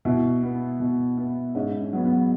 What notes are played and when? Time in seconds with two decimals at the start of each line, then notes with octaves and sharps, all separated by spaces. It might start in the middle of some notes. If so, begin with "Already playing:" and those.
0.05 B2 E4
0.43 B3
0.80 B2
1.18 B3
1.55 G#2 C#4
1.80 C#4
1.93 F#3 B3
2.05 B3